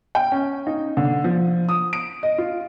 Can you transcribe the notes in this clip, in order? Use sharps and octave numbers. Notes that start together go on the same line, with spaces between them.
G5
C#4
D#4
D3
F3
D#6
D7
D#5
F4